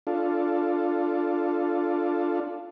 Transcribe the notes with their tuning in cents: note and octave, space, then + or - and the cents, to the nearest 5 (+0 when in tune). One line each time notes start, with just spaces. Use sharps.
D4 +0 F4 -5 A4 +0